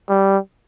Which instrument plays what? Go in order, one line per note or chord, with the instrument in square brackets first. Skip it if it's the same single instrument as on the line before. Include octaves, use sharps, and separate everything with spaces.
[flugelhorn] G3